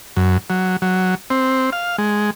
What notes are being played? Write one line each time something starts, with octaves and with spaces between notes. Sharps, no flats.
F#2
F#3
F#3
C4
F5
G#3